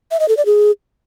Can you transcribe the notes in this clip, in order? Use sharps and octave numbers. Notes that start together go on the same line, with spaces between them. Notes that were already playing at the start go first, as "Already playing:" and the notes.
E5
D#5
A4
D5
G#4